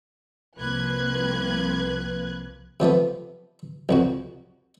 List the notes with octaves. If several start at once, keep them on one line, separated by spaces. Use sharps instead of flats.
C2 F3 A#3 B4 F#6 G#6
C3 F3 A3 B3
C2 F2 F#4